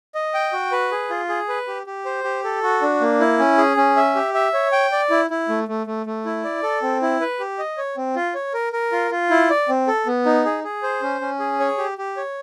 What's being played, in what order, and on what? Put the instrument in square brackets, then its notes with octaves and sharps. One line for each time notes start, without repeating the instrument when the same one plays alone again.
[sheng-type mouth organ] D#5
G5
F#4
B4
G#4
F4
G#4
B4
G4
G4
C5
G4
A4
F#4
D4
A#3
E4
C#4
G#4
C#4
E5
G4
E5
C#5
G5
D5
E4
E4
A3
A3
A3
A3
E4
D5
A4
C4
E4
B4
G4
D#5
C#5
C4
F4
C#5
A#4
A#4
F4
F4
E4
D5
C4
A4
B3
D#4
G#4
G#4
C5
C#4
C#4
G#4
C#5
G4
G4
C#5